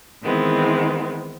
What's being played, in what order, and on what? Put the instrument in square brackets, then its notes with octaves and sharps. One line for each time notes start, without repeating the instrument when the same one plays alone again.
[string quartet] D#3 E3 G#3 B3 C4